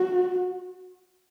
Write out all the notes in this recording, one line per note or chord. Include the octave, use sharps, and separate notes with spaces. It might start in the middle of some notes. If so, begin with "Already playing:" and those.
Already playing: F#4